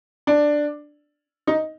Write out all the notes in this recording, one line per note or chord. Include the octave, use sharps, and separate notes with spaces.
D4
D#4